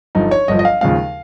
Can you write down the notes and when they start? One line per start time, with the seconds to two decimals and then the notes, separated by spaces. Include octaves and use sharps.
0.15 G1 G2 F3 D#4
0.31 C#5
0.48 G1 G2 F3 D#5
0.59 D#5
0.65 F5
0.81 D#2 C#3 F3 G#3 F5